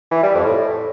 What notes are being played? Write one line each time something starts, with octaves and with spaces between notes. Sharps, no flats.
E3
G3
F2
A2